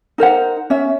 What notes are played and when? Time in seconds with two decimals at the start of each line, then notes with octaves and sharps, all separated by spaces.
0.18 D#4 A#4 C5 F#5
0.70 C#4 E5